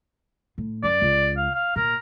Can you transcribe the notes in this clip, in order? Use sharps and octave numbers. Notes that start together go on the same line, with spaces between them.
A2
F#2 D5
C#2
F5
F5
A#2 A#4